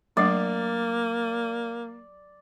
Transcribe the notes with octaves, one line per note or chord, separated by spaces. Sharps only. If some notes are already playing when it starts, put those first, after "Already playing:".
F#3 A3 A#3 D4 D5